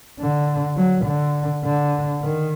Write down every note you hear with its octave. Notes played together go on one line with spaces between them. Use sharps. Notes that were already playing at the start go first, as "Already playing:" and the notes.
D3
F#3
D3
D3
D#3